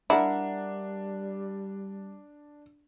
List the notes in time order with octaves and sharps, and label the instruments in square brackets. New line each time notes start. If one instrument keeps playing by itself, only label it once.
[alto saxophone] G3 [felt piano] D4 [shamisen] E4 [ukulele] A#4 F#5